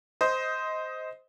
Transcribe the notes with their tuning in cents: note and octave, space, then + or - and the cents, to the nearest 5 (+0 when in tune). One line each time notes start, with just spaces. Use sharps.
C5 -10 D#5 +15